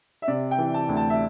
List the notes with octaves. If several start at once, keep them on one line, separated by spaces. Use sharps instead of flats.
E5
C3 D5
G5
E3
A5
D2
A5
E5